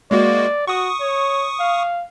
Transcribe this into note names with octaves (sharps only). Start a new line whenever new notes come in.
G#3 A#3 F#4 D5
F#4 C#6 D#6
C#5
F5